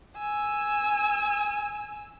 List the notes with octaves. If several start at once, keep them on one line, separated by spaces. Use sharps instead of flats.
G#5 E6